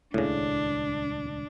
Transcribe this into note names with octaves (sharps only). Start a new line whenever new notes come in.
D#1 C#2 A2 C#3 D4